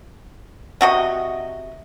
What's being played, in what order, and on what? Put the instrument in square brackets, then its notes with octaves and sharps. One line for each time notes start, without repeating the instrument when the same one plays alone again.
[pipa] C3 F#4 D#5